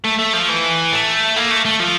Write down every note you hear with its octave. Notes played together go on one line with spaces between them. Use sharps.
A3
A3
F3
E3
A3
A#3
A3
A3
F3